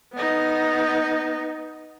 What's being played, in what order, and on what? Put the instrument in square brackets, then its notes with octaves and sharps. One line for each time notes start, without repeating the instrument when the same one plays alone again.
[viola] B3 D#4